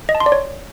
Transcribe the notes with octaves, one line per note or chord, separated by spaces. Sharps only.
D#5
A5
C6
D5
C#5